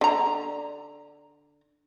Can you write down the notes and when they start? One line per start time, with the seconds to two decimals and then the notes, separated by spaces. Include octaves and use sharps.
0.01 D3 A#5